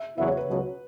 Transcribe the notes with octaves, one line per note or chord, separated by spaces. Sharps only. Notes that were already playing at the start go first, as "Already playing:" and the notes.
Already playing: E5
E2 C#3 F#3 B3 E4 E5
C#5
B4
C#2 B2 F#3